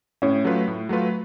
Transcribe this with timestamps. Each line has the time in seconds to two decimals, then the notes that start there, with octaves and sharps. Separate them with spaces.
0.22 A2 C#4
0.45 F#3 A3 F4 B4
0.67 A2
0.89 F#3 A3 F4 B4